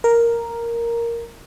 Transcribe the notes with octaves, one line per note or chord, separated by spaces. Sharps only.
A#4